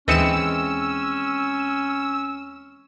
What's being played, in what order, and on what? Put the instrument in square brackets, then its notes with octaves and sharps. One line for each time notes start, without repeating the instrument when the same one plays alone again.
[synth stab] D#2 C#7 E7 [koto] E3 G#3 C4 [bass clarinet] C#4 [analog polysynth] E6